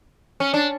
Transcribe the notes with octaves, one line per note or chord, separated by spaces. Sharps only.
C#4
D4